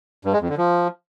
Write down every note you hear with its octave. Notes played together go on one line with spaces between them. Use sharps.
G2
G#3
F2
D3
F3